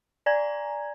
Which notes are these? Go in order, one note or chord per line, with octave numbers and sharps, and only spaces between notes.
D5 G#5 A#5 G#6